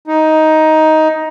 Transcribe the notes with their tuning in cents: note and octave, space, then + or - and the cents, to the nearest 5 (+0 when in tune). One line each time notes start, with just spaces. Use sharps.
D#4 +10